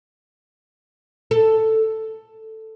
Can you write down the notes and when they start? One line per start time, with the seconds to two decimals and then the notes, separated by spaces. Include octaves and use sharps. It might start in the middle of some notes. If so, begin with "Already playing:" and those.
1.31 A4